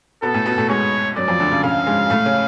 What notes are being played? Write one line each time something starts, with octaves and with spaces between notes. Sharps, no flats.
B2 B3 A4
A2 A3
B2 B3
A2 A3
G#2 G#3 C#5
F#2 F#3 D5
F2 F3
D2 D3
C#3
C#3 F5
G#2 G#3
A2 A3
C#3 C#4